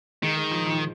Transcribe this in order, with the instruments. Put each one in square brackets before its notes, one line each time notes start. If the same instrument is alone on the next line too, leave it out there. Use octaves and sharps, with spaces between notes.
[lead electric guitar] D#3 [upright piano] G#3
[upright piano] G#3
F3
F3